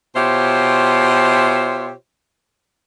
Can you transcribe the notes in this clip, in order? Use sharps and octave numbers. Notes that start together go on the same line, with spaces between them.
B2 F4 G4 C5 C#5 E5